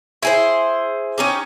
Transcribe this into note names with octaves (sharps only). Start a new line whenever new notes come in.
E4 G#4 C5
C#4 D#4 G4